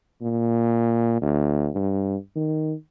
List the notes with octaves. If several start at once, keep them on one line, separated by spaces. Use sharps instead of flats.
A#2
D2
G2
D#3